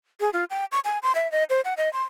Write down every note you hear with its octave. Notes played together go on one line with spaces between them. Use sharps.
G#4
F4
G5
C#6
G#5
C6
E5
D#5
C5
F#5
D#5
C6